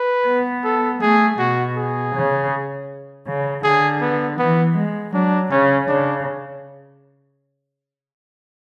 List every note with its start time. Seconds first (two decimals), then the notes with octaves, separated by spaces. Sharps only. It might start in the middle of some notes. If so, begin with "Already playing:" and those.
Already playing: B4
0.27 B3
0.64 A4
1.01 A3 G#4
1.38 B2 F#4
1.77 G#4
2.14 C#3
3.26 C#3
3.64 D3 G#4
4.01 B3
4.39 E3 B3
4.77 G#3
5.14 F#3 D4
5.51 C#3 C#4
5.89 C#3 D4